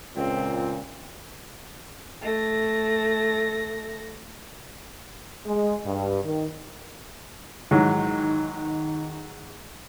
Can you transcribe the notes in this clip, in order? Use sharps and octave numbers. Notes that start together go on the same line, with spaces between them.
C#2 A#2 C4
A3 A#6
G#3
G2
D#3
G#2 D#3 E3 F#3